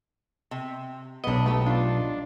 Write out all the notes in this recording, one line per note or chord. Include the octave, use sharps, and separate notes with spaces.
C3
B1 B3 D4 D#5
A3 B3 G4
D4 F4